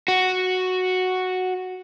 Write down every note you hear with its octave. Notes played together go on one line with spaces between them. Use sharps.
F#4